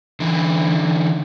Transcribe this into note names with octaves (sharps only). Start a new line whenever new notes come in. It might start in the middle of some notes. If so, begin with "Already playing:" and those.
D3 E3